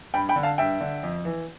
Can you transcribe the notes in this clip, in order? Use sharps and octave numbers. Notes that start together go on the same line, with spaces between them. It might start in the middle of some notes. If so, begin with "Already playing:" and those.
G2 G5 B5
G5 B5
D3
F5 A5
G2 E5 G5
D3
F2
E3